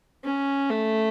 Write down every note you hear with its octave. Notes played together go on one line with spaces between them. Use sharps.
C#4
A3